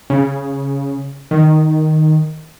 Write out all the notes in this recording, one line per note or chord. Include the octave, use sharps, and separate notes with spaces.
C#3
D#3